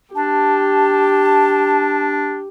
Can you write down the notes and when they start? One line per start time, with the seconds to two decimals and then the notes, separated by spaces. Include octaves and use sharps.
0.15 D4 G4 A5